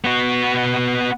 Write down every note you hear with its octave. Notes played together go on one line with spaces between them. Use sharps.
B3 F#4